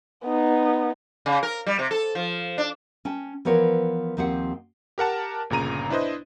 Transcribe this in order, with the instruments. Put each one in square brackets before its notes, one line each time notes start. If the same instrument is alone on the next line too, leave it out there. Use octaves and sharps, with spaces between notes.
[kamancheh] B3 D#4
[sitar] C#3
A#4
G3
C3
A4
F3
D4
[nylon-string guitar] C#4 G5 A5
E3 F3 B3 A#4 C#5
D#2 F3 C4 G4 F#5
[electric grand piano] G4 A#4 F#5 A5
G1 A#2 C#3 A#5 D#7
D4 E4 B4 C5 D#5